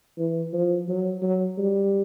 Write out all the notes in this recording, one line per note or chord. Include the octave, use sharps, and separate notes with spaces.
E3
F3
F#3
F#3
G3